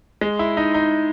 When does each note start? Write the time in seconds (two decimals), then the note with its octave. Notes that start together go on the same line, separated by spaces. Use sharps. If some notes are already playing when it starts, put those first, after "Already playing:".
0.21 G#3
0.39 E4
0.57 D#4
0.74 D#4